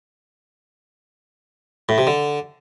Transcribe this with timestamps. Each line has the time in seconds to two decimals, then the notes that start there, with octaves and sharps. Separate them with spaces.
1.89 A2
1.98 C3
2.07 D3